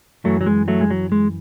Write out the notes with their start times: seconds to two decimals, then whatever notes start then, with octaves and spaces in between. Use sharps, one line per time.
0.24 F#2 E3 F#3 A3
0.41 F#3
0.46 G#3
0.68 F#3 A3
0.81 G#3
0.91 F#3
1.12 G#3